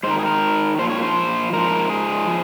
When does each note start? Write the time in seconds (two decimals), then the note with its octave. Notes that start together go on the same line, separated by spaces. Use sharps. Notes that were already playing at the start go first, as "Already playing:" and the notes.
0.03 G#2 C5
0.07 D#3 A#4
0.19 G#4
0.26 A#4
0.78 A#2 F3 C5
0.90 C#5
1.03 C5
1.53 G#2 F3 A#4
1.90 G#4
2.27 F3